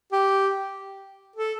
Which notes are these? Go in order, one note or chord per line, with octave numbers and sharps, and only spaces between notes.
G4
A4